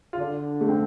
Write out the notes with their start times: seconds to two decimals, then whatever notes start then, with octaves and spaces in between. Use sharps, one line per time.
0.13 F4
0.18 D3 D4
0.61 A3
0.69 C4